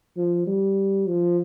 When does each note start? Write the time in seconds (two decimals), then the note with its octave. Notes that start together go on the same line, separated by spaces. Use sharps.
0.17 F3
0.47 G3
1.07 F3